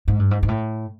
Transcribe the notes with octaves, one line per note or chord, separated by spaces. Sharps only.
G#2
G2
G#2
G#2
A2